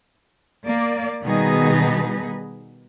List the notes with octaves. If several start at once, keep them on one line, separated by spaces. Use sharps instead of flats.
A#3 D5
B2 D#3 G3 D#4 G#4 B4